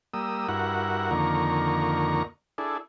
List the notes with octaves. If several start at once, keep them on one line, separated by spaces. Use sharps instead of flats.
G3 A#3 D#6 E6
G2 E4 F#4 A#4 F#5
F2 D3 D#3 A#3 A#5 C#6
D4 E4 G#4 A4